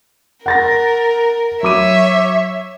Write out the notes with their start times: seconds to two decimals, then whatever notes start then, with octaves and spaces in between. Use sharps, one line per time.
0.46 A#4 F#5 A6 A#6
1.63 F#3 C#5 E5 D6 D#7